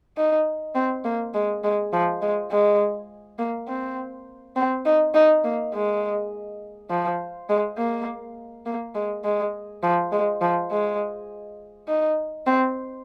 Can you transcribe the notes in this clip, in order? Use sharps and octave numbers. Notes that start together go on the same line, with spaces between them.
D#4
C4
A#3
G#3
G#3
F3
G#3
G#3
A#3
C4
C4
D#4
D#4
A#3
G#3
F3
G#3
A#3
A#3
G#3
G#3
F3
G#3
F3
G#3
D#4
C4